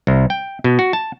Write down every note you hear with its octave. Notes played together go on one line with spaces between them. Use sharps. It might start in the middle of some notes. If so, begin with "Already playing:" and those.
C2
G5
B2
F#4
A5